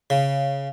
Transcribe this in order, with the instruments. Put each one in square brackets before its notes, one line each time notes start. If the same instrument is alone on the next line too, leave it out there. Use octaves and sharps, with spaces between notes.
[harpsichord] C#3